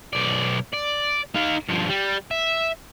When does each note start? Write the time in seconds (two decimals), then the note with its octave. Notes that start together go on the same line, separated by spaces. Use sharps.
0.13 B1 D5
0.73 D5
1.35 D#4 F5
1.68 G2 F3
1.89 G3
2.31 E5